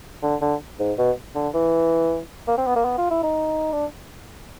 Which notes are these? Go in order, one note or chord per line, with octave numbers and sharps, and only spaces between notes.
D3
D3
G#2
B2
D3
E3
A#3
C4
B3
A#3
B3
F4
E4
D#4
D4